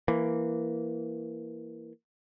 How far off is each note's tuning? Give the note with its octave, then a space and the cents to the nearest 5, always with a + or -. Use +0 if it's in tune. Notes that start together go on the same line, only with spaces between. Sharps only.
E3 +10 A#3 +0